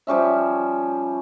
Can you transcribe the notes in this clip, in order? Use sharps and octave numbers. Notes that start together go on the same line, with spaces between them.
F3 G3 C#4 E5